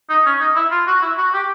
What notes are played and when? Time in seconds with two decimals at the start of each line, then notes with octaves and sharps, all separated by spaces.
0.09 D#4
0.26 C#4
0.40 D#4
0.55 E4
0.71 F4
0.87 F#4
1.02 E4
1.18 F#4
1.33 G4